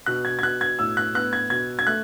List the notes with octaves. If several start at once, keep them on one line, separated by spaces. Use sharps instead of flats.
B2 F#6
G#6
G#6
B2 F#6
G#6
A2 E6
F#6
B3 F#6
G#6
B2 G#6
G#6
A3 F#6